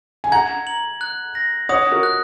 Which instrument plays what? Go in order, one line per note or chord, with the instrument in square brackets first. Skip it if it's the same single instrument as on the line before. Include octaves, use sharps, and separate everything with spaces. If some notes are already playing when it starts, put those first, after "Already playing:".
[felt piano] G#5
[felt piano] F#5 A#5 [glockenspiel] G#6
[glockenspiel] F#7
F#6
A#6
[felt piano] C#5 F#5 [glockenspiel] D#6
[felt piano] F#4 A#4
[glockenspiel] F#6